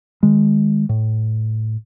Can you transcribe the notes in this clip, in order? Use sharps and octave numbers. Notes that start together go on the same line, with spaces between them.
D#3 G#3
A2